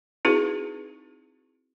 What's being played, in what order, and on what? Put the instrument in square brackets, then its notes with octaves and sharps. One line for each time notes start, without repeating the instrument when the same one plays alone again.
[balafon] C4 D#4 E4 F#4 G#4 B4